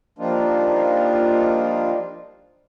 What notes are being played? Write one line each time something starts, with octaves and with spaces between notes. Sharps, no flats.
F3 G3 A#3 D4 D#4 F4